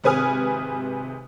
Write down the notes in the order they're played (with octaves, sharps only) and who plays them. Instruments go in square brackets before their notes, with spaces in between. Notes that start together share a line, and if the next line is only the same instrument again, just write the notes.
[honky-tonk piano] G#1 C3 B4 G#5 D#6 F6